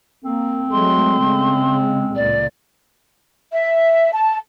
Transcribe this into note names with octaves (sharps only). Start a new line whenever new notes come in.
A#3 C4
F#3 G#3 A3 C6
C#3 G#3
C#2 A#2 D5
E5
A5